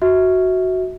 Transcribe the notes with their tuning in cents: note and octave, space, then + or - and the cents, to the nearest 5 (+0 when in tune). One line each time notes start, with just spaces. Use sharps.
F#4 +0 E5 -25